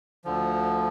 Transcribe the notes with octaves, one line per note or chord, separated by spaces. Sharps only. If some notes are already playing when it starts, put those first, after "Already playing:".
D2 D3 F3